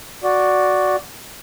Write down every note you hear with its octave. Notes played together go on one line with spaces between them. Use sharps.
F#4 D5